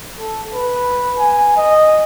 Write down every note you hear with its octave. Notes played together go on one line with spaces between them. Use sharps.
A4
B4
G#5
D#5